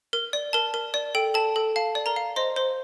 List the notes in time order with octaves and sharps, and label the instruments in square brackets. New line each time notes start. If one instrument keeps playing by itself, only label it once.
[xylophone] A#4
D5
A#4 A5
A#4
D5
A4 G5
A4 A5
A4
F5 A5
D5
A#4 A#5
F5
C5 D#5 C6
C5 C6